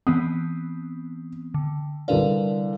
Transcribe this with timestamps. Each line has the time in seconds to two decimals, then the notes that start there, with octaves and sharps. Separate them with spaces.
0.07 E3 B3 C4 D#6
1.54 D3
2.08 C2 D3 A#4 B4 D5 F5